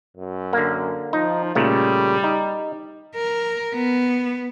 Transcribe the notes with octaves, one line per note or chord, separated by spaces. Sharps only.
F#2
D3 A#3
F3 D#4
A#2 C#3 G3 A3
D#4
A#4
B3